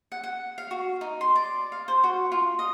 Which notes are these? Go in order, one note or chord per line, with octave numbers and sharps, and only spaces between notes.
F#5
F#5
F5
F#4
D#4
C6
D5
F5
C5
F#4
F4
D#5